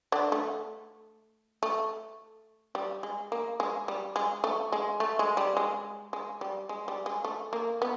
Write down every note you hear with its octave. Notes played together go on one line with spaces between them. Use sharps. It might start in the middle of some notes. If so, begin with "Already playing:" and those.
D3 D4
A3
A3
G3
G#3
A#3
G#3
G3
G#3
A3
G#3
A3
G#3
G3
G#3
G#3
G3
G#3
G3
G#3
A3
A#3
B3